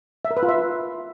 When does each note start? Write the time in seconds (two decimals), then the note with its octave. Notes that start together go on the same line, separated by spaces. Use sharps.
0.25 E5
0.31 A#4
0.37 B4
0.43 F4
0.49 E5